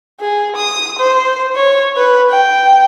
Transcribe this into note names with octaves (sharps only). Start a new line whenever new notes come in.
G#4
D#6
C5
C#5
B4
G5